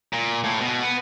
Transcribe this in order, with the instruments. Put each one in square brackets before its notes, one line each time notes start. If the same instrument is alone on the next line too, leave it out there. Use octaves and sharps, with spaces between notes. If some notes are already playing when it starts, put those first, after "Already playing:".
[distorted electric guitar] A#2
A2
B2
B3